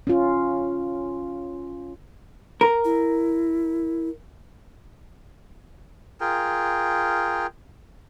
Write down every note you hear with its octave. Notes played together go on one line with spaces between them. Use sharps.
C#4 F4
A#4
E4
F4 G#4 A#4 G5